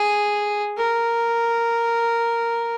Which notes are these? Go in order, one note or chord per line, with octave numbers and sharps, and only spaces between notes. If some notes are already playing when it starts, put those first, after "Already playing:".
Already playing: G#4
A#4